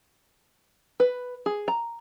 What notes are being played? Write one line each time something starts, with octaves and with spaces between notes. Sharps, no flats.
B4
G#4
A#5